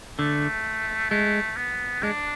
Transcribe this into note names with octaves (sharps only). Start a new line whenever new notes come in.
D3 A3
G#3 A3
B3
G#3 D4